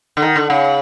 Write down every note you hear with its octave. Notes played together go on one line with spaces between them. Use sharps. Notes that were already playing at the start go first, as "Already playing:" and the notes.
D3
D#3
D3
C#3